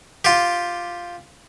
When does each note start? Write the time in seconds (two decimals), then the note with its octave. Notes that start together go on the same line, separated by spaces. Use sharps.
0.25 F4 G4